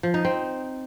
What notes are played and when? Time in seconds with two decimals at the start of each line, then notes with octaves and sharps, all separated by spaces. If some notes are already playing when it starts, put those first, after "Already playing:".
0.03 F3
0.14 D#4
0.25 C4